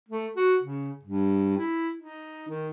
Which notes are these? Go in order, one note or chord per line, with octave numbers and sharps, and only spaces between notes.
A3
F#4
C#3
G2
E4
D#4
D#3